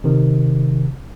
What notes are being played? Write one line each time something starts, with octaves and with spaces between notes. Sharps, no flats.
C3 D#3